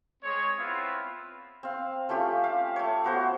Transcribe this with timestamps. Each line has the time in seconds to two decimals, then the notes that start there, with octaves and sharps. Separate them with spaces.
0.23 G#3 C4 C#5
0.59 B3 C4 E4 F4 B4
1.63 C4 F5
2.09 A3 C#4 F4 G4
2.44 F5
2.76 A3 C#5
3.04 B3 F#4 C5